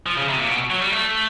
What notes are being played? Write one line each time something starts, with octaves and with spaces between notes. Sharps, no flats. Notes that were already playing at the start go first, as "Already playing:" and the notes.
F3
C#3
C3
A#2
B2
F#3
G3
A3